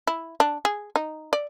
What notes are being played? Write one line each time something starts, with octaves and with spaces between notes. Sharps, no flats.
E4
D4
G#4
D#4
D5